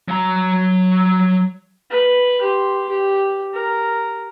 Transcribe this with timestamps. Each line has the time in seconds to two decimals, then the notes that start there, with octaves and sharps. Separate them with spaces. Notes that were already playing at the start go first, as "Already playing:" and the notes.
0.08 F#3 A#5
1.90 B4
2.41 G4 C6
2.89 G4
3.53 A#4